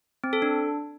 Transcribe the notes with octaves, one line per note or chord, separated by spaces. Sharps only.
C4
A4
D4